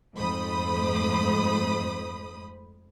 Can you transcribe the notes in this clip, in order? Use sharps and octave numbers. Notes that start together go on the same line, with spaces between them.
F2 G#2 A3 C5 B5 D#6